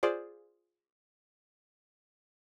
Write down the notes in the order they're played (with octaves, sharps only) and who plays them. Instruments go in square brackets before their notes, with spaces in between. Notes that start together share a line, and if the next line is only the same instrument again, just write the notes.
[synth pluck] F4 G#4 C5 D5